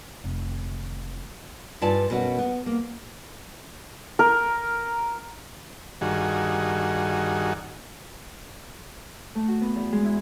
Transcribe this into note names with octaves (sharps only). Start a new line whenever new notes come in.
F1 D#3
G2 E4 F4 D5 G#5 A5
F#2 B2 C#4 F#4
B3
A#3
A#4
G2 D#3 F#4 G#4
A3
F#4
B3
E2
G#3
E4